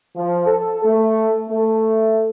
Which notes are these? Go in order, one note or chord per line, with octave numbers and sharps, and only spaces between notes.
F3
A4
A3
A3